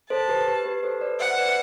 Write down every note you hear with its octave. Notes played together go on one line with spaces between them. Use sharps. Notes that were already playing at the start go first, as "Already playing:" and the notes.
A4 C5 A5
G4 B4
G4 B4
G4 B4
A4 C5
B4 D5
C5 E5 F#5
B4 D5